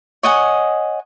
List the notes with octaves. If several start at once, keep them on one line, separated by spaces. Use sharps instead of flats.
C#5 D#5 F#5 G#5